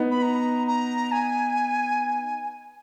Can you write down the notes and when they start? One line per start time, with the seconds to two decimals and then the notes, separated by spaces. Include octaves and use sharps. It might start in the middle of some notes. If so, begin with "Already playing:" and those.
Already playing: B3 D#4
0.11 B5
0.23 A#5
0.67 A#5
1.12 G#5